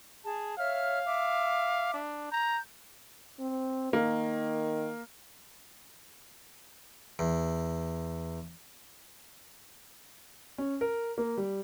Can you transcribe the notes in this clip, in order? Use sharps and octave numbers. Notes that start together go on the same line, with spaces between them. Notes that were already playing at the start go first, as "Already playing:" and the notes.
G#4 A5
C#5 E5 F5 F6
E5 D6
D4
A#5 G6
C4
D#3 A#3
E2
C#4
A#4
A#3
G3